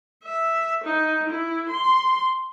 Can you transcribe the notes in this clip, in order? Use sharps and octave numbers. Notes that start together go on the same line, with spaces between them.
E5
D#4
E4
C6